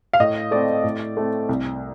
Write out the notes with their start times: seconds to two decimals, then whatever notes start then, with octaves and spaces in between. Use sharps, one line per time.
0.13 F5
0.20 A2 D#5
0.51 A3 C4 D5
0.84 A2
1.17 A3 C4
1.49 C2